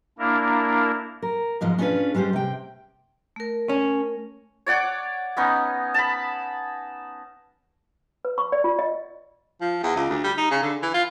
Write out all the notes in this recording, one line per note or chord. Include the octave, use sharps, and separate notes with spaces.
A#3 D4 E4 A#4
A#4
G#2 B2 F3 G#3
C#4 D4 F4 G#4 B4
G3 G#3 C#4 G4 C5
C3 G5
A3 A#4
C#4
C#5 D5 F#5 D6
B3 C#4 D#4
A5 B5
B4
C#6
D5
F4
D#5
F3
E2
C#2
D2
G3
D#4
C#3
D3
E3
F4